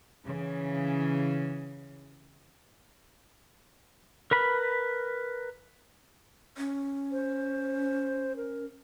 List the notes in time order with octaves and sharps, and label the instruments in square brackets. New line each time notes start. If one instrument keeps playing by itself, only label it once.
[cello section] C#3 E3
[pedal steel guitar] A#4 B4 B5
[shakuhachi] C#4
[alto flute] C5
A#4